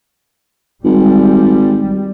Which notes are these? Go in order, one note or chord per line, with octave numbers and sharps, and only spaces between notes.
G#1 G3